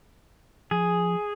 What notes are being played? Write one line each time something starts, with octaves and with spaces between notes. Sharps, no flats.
F3 G#4